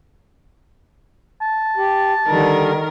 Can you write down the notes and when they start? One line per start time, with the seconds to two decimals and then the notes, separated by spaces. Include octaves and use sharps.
1.41 A5
1.77 G4
2.27 D3 D#3 G3 A#4